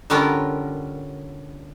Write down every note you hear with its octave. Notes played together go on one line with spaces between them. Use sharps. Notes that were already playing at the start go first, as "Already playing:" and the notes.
D3 G3 B3 C#4 F4 A#4